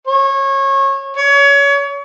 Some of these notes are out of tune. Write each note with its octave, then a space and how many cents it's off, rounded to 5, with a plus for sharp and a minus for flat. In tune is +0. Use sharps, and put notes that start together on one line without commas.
C#5 -25
C#5 +30